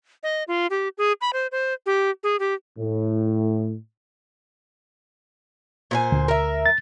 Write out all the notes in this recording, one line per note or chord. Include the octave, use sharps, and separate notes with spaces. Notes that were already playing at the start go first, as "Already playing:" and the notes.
D#5
F4
G4
G#4
B5
C5
C5
G4
G#4
G4
A2
A#2 C5 G#5
D2
A#4 E5
A6